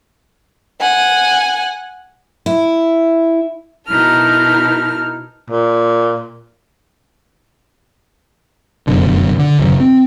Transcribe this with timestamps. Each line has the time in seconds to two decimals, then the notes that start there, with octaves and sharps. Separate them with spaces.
0.81 F#5 G#5
2.46 E4
3.88 B2 D#4 E4 A#4 A5 F6
5.50 A#2
8.87 F1 F#2 B2 D3
9.39 D3
9.59 D#1 F#2 C#3
9.80 C4